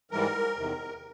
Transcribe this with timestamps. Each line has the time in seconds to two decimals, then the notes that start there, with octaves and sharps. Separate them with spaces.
0.11 G#2 E3 G3 A#4
0.57 E2 C3 D#3